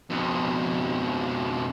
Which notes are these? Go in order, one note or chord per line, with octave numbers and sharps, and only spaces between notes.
F2 B2